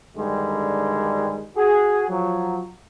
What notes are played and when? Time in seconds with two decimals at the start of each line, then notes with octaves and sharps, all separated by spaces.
0.17 G2 D3 D#3 G3 G#3
1.57 F#4 G#4
2.09 F3 F#3